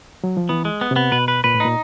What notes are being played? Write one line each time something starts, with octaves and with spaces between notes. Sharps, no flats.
F#3
F3
E3 B3
G#3
B3
C3
B3
B2 B4
B4
A#2 B4
A2
A#2 D#4